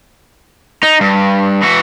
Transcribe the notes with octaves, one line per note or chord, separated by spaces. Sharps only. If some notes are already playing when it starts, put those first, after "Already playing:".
D#4
G2
E3 F#4